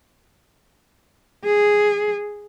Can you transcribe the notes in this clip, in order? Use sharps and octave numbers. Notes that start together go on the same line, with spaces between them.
G#4